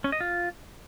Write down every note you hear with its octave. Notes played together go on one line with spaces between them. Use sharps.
C#4
D#5
F4